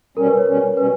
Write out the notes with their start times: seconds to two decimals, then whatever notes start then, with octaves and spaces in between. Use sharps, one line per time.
0.17 B2 G3 C#4 A#4
0.27 B4
0.37 C#5
0.47 B2 G3 C#4
0.76 B2 G3 C#4 B4